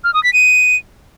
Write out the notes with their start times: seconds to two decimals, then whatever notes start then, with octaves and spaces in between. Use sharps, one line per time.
0.04 F6
0.14 D#6
0.23 B6
0.33 D#7